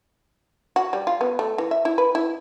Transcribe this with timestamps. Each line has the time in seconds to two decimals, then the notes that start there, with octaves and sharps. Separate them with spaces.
0.76 F#4
0.93 G3
1.07 F4
1.21 B3
1.39 A3
1.58 E3
1.71 E5
1.85 E4
1.98 B4
2.15 E4